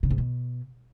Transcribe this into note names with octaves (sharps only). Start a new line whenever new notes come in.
C#3
G#2
B2